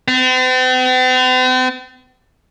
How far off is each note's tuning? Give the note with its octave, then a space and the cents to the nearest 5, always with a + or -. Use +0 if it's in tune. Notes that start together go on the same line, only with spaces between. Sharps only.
C4 -45